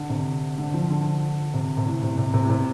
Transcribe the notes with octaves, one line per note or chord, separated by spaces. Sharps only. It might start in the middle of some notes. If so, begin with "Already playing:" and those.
Already playing: D3
C3
D3
F3
D3
C3
C3
A2
C3
C3
C3
A2
C3